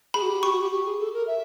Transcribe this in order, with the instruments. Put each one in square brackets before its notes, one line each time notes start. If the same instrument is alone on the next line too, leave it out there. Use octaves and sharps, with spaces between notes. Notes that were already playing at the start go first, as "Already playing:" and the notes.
[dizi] G#4 [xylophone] B5
[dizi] F#4
G4
[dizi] G4 [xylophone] C#6
[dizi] F#4
G4
G4
G#4
A4
A#4
E5